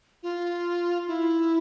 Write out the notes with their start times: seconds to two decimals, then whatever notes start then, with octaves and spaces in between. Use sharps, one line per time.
0.23 F4
1.07 E4